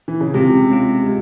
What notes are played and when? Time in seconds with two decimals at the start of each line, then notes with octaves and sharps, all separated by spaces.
0.08 E3
0.21 C#3
0.34 C3 G#3 C#4 F4
0.70 G#3 C#4 F4
1.06 G#3